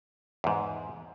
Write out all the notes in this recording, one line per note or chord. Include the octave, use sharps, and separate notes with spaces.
E2 G#2